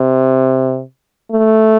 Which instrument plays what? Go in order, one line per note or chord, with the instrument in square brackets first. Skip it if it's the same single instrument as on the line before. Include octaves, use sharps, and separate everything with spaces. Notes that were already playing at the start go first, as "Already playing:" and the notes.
Already playing: [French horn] C3
A3